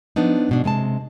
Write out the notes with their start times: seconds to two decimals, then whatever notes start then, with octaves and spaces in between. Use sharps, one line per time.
0.16 F3 F#3 B3 D4 D#4
0.49 G#2 B2 D4
0.64 C3 G#3 G#5 A5